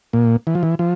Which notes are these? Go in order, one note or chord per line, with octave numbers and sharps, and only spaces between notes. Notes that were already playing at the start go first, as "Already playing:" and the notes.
A#2
E3
F3
E3
F3